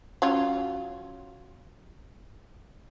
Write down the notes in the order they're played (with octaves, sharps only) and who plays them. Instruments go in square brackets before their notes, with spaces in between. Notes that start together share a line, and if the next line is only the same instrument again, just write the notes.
[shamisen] F#3 C#4 F4